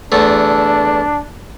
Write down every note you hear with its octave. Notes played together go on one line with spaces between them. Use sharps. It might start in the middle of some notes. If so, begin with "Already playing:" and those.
E2 A3 D4